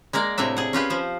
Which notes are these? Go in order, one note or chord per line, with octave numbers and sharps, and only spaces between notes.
G#3 A#3 A#4 D5
A2 C3 D4 E5
G#4 F#5
C#4 F4 G4 B4
F3 C5